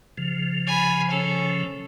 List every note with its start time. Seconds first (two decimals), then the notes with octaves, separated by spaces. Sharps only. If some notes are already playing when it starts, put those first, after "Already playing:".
0.18 C#3 F3
0.67 G#5 B5
1.10 C#4 A4